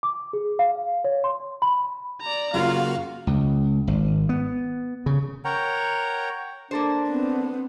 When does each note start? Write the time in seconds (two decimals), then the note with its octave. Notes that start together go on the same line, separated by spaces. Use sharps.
0.03 D6
0.33 G#4
0.59 F5
1.04 C#5
1.24 C6
1.62 B5
2.22 D5 A#5
2.54 F#2 C#3 A#3 F4 F#4 F5
3.27 C#2
3.87 G#1
4.29 B3
5.06 C#3
5.45 A#4 C#5 F#5 G5 A#5
6.71 A#3 D4 A4 C5
7.08 B3 C4